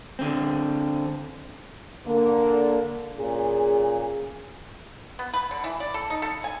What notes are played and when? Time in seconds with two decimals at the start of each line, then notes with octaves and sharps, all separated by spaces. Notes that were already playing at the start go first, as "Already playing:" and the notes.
0.19 D3 C4
2.06 D3 A#3
3.18 A#2 C#4 G#4
5.19 B3
5.33 B4
5.51 D3
5.64 E3
5.80 D5
5.94 A4
6.10 D#4
6.22 A4
6.44 G#5